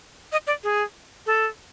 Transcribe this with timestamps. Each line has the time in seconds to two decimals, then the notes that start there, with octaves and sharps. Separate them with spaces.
0.32 D#5
0.47 D5
0.64 G#4
1.26 A4